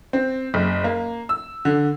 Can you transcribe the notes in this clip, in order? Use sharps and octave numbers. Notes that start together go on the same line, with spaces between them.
C4
F#1
A#3
E6
D3